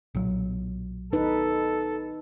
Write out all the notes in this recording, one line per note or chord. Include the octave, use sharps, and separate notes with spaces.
B1 A#2 F#3
D#4 A4 B4